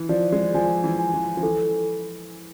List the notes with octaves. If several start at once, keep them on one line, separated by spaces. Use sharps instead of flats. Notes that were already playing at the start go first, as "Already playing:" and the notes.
Already playing: E3
F3 D5
G#3
F3 G#5
E3
G#5
F3
F3
E3 A4